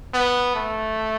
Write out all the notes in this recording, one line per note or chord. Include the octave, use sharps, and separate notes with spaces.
B3
A3